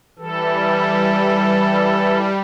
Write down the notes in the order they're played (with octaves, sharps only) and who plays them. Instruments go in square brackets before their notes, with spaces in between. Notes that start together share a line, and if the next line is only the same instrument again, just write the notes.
[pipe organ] E3 A4 [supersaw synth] G3